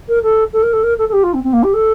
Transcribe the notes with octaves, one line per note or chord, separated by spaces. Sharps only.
A#4
A4
A4
A#4
A4
A#4
A4
A4
G4
F4
C4
C4
A#3
G4
A4